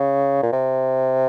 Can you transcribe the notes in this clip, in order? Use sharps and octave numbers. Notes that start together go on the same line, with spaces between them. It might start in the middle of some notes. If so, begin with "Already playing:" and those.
Already playing: C#3
A#2
C3